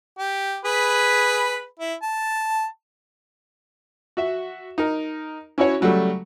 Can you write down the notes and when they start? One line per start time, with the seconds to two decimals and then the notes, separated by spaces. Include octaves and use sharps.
0.19 G4
0.65 G#4 B4 B5
1.80 E4
2.02 A5
4.17 F#4 E5
4.78 D#4 A#4
5.58 C#4 E4 F#4 C#5
5.81 C#3 F#3 G3 A3